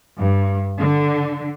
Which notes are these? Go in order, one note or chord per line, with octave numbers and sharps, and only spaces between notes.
G2
D3